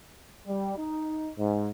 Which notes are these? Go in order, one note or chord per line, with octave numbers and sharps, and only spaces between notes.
G3
D#4
G#2